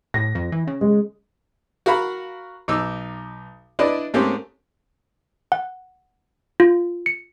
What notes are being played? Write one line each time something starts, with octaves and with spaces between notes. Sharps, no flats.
A2 A#6
F2
E3
C#3
G#3
F#4 A#4 F5 F#5 B5
B1 D#4 D6 E6
D4 E4 B4 D5 D#5
G#2 A3 A#3 C4 C#4 G4
F#5
F4
C#7